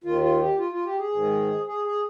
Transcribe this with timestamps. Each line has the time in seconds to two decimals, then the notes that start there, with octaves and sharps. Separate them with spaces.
0.04 D#2 D#3 F4
0.22 F4
0.39 G4
0.58 F4
0.71 F4
0.85 G4
0.98 G#4
1.12 G#2 D#3
1.67 G#4
1.84 G#4